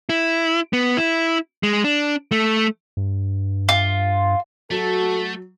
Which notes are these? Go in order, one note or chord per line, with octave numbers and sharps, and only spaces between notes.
E4
B3
E4
G#3
D4
A3
G2
F4
F#3 A3 F#4 A4